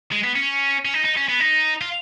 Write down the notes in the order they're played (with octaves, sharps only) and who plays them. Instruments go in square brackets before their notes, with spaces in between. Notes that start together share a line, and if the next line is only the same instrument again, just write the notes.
[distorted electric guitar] G#3
B3
C#4
C#4
D#4
D#4
C#4
B3
D#4
F4